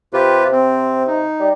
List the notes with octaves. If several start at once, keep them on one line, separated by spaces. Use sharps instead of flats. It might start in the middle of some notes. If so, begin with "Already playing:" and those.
C3 F4 G4 B4
C4
D#4
G3